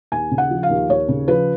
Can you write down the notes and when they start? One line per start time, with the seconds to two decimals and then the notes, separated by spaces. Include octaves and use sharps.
0.12 D#2 G#5
0.31 C#3
0.38 F#5
0.51 F3
0.63 F5
0.70 D#2
0.89 D#2 C#5
1.08 C#3
1.28 F3 B4